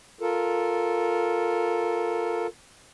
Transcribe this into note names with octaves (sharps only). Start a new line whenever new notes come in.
F4 A4 A#4